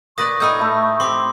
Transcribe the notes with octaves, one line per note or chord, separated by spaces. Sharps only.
A#2 B4 D5 C#6 D#6 A#6
A2 D#4 G#5 B5 E6 G6
A3 E4
C4 G4 C6 D6